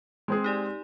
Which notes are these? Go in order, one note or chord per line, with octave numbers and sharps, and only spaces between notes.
G#3 C4 G#4
D#4 G4 D5